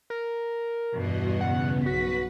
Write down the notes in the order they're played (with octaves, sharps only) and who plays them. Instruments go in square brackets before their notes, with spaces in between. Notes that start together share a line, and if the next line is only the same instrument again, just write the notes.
[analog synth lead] A#4
[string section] E2 G2 B2 [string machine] F#4 D#5
[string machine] C#3 B3 [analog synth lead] F#5
[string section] B1 B6 [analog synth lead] F#4 [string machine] B4 F#5